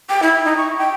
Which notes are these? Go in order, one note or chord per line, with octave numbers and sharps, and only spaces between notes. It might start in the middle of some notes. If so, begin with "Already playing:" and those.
G5
E4
D#4
C#6
G5